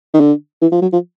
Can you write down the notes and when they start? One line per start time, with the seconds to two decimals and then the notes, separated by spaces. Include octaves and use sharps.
0.14 D#3
0.20 D3
0.62 E3
0.72 F3
0.82 F#3
0.93 F3